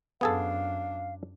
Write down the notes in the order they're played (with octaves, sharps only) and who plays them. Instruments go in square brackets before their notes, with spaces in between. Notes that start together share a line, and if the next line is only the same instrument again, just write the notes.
[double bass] F#2 D4 [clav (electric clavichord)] B3 G#4 A4 [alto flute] F5